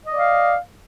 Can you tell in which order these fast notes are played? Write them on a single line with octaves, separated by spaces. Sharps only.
D#5 D5 F5